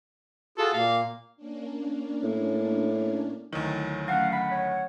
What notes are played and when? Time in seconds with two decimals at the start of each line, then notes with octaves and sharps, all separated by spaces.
0.58 F4 F#4 G#4 A4
0.74 A#2 A#3 F5
1.36 A#3 C#4 D4
2.23 A2
3.53 D2 D#3 F#3 E4
4.08 F#3 A3 C#4 F5 F#5
4.33 F#5 B5
4.51 C#5